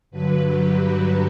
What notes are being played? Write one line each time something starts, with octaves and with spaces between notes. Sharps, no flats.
G2 D3 F#3 B4
G4
F#4